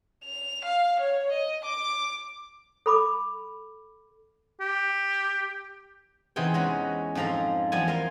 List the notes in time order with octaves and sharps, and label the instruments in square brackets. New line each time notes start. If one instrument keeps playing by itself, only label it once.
[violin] F7
F5
C#5
D#5
D6
[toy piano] A4 B5 D6
[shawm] G4
[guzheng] E2 C3 E3 D#4 G#4 G5
G#3 C#4 F#4
F2 G#2 F3 F5 A#5
E2 F3 G3 G#5
A#4 F5 G#5 C6